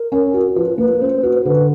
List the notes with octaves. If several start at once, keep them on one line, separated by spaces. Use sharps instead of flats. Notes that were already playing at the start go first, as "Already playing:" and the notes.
Already playing: A#4
C#4
F#4
F3 B4
A#3 B4
C#4 C5
F#4 B4
D3 B4